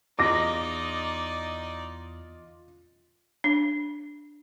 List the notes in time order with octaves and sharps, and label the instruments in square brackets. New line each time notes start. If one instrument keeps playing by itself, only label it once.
[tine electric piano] E2 [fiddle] D#4 D5 [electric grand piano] F4 D#5 [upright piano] D6 A#6
[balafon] D4